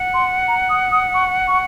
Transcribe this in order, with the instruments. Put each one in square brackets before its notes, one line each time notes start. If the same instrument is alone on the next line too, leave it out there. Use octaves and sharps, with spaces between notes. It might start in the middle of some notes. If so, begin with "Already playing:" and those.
Already playing: [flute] F#5
[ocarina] C6
A#5
D#6
D#6
C#6
C#6